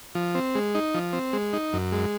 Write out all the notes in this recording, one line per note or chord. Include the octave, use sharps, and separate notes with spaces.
F3
C4
G#3
D#4
F3
C4
G#3
D#4
F#2
G#3